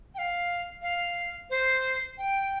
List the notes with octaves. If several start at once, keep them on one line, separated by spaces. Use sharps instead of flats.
G5
F5
F5
C5
G5